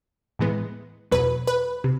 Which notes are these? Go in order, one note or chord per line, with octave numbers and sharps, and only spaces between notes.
A2 E3 G#3 B3
E2 B2 F#3 B4
B4
C3